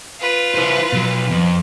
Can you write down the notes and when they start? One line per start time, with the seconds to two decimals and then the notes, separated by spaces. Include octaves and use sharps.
0.20 F4 B4
0.54 E4 C5
0.93 B2 F#3
1.31 F2